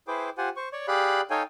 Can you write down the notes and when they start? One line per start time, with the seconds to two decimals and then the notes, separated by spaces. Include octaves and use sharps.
0.08 E4 G#4 B4 C5 G5 D6
0.38 F4 G4 C5 F#5 G#5
0.57 C5 C#6
0.73 C#5 D5 C#6
0.88 G4 G#4 D5 F5 B5 F#6
1.30 D#4 A4 C#5 F5 G5 G#5